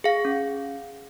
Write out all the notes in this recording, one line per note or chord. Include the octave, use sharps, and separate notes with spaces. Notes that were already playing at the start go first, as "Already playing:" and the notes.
G#4 F5
C#4